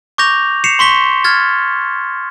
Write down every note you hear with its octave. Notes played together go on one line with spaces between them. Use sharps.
C#6 D6 G6 A#6 F7
C7 C#7 E7 F7
C6 C#6 B6 G7
F6 G#6 A6